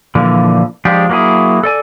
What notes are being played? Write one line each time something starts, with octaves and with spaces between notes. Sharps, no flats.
A#2 D3 E3 F3
F3 G#3 D4 G4
F#3 A#3 C4 E4 G#4
A4 D5 G#5